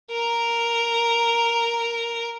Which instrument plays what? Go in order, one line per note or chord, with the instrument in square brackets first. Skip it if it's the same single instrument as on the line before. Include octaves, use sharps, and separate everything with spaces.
[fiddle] A#4 A#5